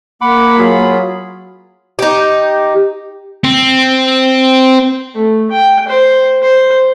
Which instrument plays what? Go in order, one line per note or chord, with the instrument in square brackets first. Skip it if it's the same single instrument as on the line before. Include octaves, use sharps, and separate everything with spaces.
[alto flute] A#3 [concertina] F#5 D6 [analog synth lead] B5
[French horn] F#3 [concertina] F4 G#4
[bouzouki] D#4 G4
[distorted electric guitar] C4
[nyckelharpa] A3
G5
C5
C5